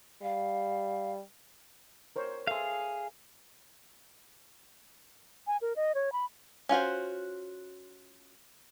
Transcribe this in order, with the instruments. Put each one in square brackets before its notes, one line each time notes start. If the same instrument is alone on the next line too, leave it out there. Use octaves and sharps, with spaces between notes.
[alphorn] G3 [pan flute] F5
[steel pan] A#4 C5 C#5
[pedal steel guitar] G#4 F5 [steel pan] A4 E5 C6
[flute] G#5
A#4
D#5
C#5
B5
[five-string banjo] C#4 F4 F#4 C5